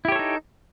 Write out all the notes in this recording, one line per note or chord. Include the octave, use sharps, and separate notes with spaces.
D#4 E4 G4 A4 C#5